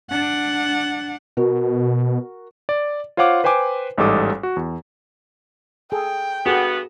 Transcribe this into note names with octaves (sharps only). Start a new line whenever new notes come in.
D4 F#5
B2 F#4 A#4
D5
F4 C5 C#5 F5 F#5 D6
B4 C5 G5 G#5 D6
A1 G#2 G3 A4 D6 D#6
F#4
E2
G#4 A4 G5
G2 B3 F#4 G#4 A4